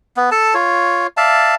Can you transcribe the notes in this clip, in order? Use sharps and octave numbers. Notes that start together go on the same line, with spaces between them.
B3
A4 A5
F4 C#5
D5 E5 F5 A5